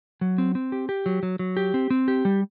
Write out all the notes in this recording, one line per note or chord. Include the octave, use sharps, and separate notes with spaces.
F#3
C4
C4
G4
G4
F#3
F#3
F#3
G4
C4
C4
G4
G3